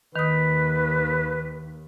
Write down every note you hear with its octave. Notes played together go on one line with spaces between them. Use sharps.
D#2 D#3 B4 D#6